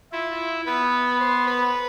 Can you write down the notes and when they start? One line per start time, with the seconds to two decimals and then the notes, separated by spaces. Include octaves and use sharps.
0.12 E4 F4
0.31 F4
0.66 B3 B4
1.20 C5
1.47 B4